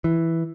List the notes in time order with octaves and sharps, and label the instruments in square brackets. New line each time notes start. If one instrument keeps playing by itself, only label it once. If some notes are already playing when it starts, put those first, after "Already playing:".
[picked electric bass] E3